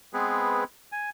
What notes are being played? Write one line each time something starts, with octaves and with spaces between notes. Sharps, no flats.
G#3 B3 C4 G#4 B4
G#5